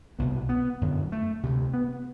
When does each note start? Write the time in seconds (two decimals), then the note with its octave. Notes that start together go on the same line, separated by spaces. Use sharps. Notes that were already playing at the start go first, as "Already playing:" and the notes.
0.19 C2 B2 B3
0.49 B3
0.81 F#2 D3
1.12 A3
1.43 D2 C3
1.74 B3